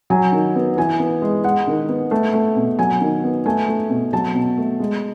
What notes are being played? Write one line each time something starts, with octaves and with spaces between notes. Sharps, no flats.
F#3 G#5
D#3
B3
E3 G#5
B3
G#3
G#3 F#5
D#3
B3
A3
A3
B2
F#3 G#5
D#3
B3
A3 G#5
A3
B2
F#3 A5
B2
A3
G#3